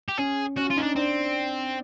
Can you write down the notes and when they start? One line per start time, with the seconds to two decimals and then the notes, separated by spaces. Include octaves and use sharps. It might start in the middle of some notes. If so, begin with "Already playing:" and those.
0.09 G4
0.18 C#4 G#4
0.57 C#4 F#4
0.71 F4
0.77 C#4 D#4
0.83 D4
0.96 C4 D4